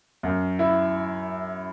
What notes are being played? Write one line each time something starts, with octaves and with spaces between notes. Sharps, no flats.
F#2
E4